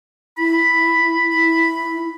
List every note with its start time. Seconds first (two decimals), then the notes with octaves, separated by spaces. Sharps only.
0.38 E4 B5
1.33 E4